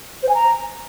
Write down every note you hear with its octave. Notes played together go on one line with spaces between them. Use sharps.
C5
G#5
A#5